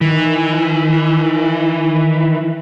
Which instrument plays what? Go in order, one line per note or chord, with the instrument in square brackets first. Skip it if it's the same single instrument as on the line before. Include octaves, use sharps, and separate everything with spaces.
[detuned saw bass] D#3 [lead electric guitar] E3